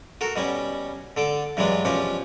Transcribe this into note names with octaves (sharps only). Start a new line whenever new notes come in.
F#4 A4 A#4
B2 G3 C#4
D3 A4 D6
G2 E3 F#3 G#3 D4
B2 F3 C#4 D4 G4